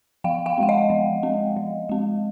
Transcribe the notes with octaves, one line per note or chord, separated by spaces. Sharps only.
F3 F5 G5
F5 G5
G#3 C4 F#5
D#5 F5
F3
G#3 C4
F3
G#3 C4